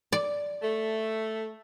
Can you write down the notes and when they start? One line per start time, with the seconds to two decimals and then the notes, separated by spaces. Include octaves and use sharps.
0.13 D5
0.62 A3